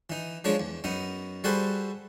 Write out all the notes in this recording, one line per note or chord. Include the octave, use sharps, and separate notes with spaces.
E3 D#4
F3 G#3 D4 G#4 C#5
E2
F#2 B3 D#4
G3 F#4 G#4 A4 B4 C5